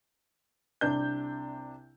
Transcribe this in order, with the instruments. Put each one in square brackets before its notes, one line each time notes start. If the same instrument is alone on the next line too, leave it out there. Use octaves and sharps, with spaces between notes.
[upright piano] C2 C3 D4 G6